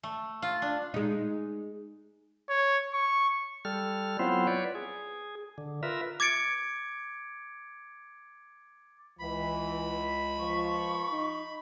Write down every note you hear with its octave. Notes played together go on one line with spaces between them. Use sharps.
A3
F4
D4
G#3 D#4
C#5
C#6
G3 A4 F6
F#3 B3 C4 E4 F4 C5
B4 C#5 D5
G#4
D3
F4 A#4 B4 E5
D6 G#6 A6 C#7 D7
C#2 E3 B5
F3 C#6
D#4